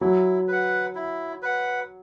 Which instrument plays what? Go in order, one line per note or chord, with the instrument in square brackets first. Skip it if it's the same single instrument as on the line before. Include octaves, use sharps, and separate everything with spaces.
[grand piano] F#3 [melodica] E4
[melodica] B4 F#5
E4
B4 F#5